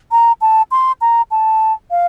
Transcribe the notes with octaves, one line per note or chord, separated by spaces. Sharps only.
A#5
A5
C6
A#5
A5
F5